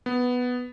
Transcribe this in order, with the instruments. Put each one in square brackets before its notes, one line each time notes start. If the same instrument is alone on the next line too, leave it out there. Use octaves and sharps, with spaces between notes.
[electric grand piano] B3